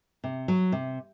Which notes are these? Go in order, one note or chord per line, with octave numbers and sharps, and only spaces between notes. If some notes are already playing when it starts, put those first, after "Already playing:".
C3
F#3
C3